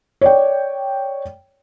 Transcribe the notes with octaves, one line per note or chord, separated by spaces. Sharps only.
C#5 D5 G5